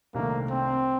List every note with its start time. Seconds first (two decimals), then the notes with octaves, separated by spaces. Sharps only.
0.14 C2 C3 D#3 A3 A#3 D4
0.50 C4